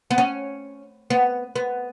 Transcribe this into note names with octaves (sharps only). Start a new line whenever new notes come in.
B3
C#4
B3
B3